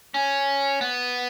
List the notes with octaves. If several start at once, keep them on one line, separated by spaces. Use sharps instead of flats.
C#4
B3